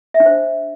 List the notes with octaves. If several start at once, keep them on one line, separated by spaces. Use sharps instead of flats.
E5
D4
C5